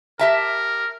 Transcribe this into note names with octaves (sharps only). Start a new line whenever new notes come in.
G4 A#4 E5 A5